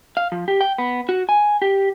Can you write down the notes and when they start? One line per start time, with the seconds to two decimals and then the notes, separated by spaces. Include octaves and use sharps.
0.17 F5
0.32 F3
0.48 G4
0.61 G5
0.78 B3
1.09 F#4
1.29 G#5
1.62 G4